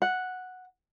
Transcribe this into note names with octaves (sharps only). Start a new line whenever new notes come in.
F#5